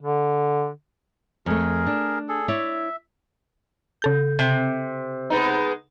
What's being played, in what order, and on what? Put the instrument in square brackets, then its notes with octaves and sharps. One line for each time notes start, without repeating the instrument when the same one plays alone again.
[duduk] D3
[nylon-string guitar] F2 A3 [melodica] G#4 A#4
[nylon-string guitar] D4
[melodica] G#4 A4
[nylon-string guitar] E4 C#5 D5 [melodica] E5
[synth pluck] C#3 A4 G6
[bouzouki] C3
[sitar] G#3 B3 D#4